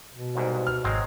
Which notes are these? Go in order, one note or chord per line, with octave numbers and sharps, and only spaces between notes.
B2
C2 G#2
F6
G#1 F#3 G#3 C4